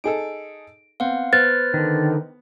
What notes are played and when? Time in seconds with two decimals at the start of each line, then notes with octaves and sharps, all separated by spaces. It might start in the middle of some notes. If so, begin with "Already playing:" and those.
0.04 D#4 G#4 A4 D7
1.00 B3 C4 F5 F#5
1.33 B3 B4 C5 F6 A6
1.74 D3 D#3